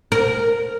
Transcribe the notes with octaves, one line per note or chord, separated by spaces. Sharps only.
A#4